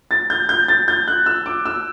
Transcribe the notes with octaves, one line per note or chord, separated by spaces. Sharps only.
A6
G6
G6
A6
G6
F#6
E6
D6
E6